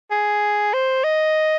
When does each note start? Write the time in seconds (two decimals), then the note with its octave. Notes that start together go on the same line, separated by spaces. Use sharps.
0.11 G#4
0.74 C5
1.04 D#5